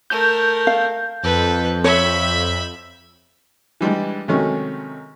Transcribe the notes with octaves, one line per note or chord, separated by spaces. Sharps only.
A3 A#4 G6
F5
F2 A4 B4
C#5 E5 B5
E3 G3 G#3 D4
C3 D#3 F#3 G#3 A3 C#4